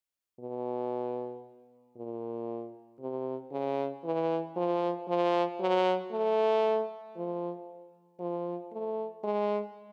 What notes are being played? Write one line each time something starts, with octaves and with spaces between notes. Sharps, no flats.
B2
A#2
C3
C#3
E3
F3
F3
F#3
A3
F3
F3
A3
G#3